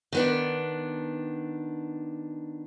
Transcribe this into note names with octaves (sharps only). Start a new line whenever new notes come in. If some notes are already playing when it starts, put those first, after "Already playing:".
D#3 B3 D4